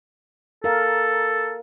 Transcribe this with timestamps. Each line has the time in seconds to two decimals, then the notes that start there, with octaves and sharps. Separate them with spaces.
0.64 A4 A#4 F5